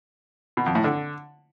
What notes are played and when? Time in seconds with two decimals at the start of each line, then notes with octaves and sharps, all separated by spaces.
0.57 B2
0.66 F2
0.75 A2
0.84 D3